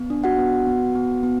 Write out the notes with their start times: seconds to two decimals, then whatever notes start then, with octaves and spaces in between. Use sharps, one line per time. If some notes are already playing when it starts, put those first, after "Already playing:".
Already playing: B3
0.10 D4
0.24 F#4 F#5
0.38 B3
0.66 B3
0.95 B3
1.23 B3